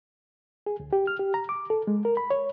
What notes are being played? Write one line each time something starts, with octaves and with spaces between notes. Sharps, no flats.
G#4
D2
G4
F6
G4
A#5
D6
A4
G#3
A#4
B5
C#5